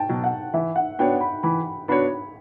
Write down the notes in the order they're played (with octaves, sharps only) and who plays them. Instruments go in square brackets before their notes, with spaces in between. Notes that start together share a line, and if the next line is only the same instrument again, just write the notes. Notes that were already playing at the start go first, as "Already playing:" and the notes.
Already playing: [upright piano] G5 A5
[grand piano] B2 F#3
[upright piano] F#5
[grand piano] E3 [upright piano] E5
[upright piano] F#5
[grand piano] B3 D4 F#4 C#5 [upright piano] G5
[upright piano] B5
[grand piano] E3 [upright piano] B5
[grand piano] B3 D4 F#4 C#5 [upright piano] B5